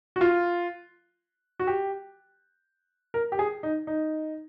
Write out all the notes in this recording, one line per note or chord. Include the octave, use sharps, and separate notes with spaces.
F#4
F4
F#4
G4
A#4
G4
G#4
D#4
D#4